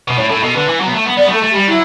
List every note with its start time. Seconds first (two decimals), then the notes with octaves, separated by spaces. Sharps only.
0.08 B2
0.17 A2 C#5
0.29 A2 A4
0.43 B2 A4
0.54 D3 B4
0.68 E3
0.80 F#3
0.86 B3
0.93 A3
1.05 B3
1.17 B3 D5
1.26 G3
1.29 A3
1.34 A4
1.43 A3
1.51 G4
1.55 G3
1.67 F#3 E4